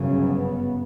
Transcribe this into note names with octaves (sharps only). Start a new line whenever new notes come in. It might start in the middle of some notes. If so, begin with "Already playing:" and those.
Already playing: G1 F#2 C#3
B3